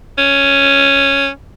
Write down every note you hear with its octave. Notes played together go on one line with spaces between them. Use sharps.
C#4